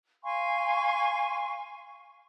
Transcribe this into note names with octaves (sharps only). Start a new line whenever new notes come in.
F5 G#5 C6 C#6